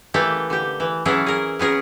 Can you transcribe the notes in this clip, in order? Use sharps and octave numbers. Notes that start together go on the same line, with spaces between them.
E3 A3 A#3 G4
D3 G4
E3
E3 F#3 C#4 E4 G#4 A4
G#4 A#4
B3 C#4 G#4 A#4